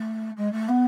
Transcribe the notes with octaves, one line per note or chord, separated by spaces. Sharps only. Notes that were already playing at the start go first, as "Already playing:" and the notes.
Already playing: A3
G#3
A3
B3